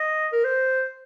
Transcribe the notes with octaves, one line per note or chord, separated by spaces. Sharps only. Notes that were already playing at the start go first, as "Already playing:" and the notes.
Already playing: D#5
A#4
C5